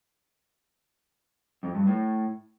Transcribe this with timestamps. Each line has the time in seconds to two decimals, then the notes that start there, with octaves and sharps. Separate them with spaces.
1.63 F2
1.75 G2
1.87 A2